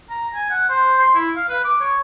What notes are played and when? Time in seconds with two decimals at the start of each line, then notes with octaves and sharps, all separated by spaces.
0.10 A#5
0.34 G#5
0.50 F#5
0.69 C5
0.99 C6
1.14 E4
1.36 F5
1.49 B4
1.64 D6
1.80 C#5